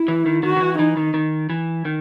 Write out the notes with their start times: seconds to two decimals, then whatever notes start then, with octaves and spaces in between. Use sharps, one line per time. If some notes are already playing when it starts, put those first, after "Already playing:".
Already playing: E4
0.08 E3
0.26 D#3
0.43 D#3 F#4
0.56 D#3
0.61 E3
0.79 E3 D#4
0.97 D#3
1.14 D#3
1.50 E3
1.85 D#3